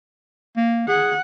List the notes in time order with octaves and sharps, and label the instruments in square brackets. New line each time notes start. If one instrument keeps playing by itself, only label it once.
[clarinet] A#3
[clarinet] G#4 [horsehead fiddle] F#5